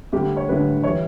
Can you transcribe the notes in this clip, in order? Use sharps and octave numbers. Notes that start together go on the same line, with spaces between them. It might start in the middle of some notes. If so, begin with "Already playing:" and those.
D2 D3 G3 G4
C#5
D2 D3 G3 B4
E3 G3 C#5